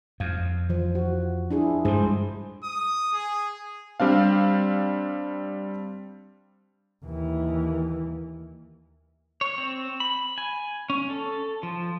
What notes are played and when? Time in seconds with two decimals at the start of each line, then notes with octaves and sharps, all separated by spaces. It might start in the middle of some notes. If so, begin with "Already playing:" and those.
0.20 F2 F5
0.69 E3 F3
0.95 F#4
1.50 D4 E4 G#4
1.85 G2 G3 G#3 G#4 C5
2.64 D#6
3.14 G#4
4.00 G3 C4 D4 F5
7.05 D#2 E3
9.41 C#5
9.58 C4
10.00 B5
10.38 G#5
10.90 C#4
11.10 A4
11.63 F3